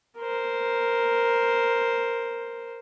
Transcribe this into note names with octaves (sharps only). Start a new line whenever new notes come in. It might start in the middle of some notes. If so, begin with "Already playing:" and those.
A#4 C5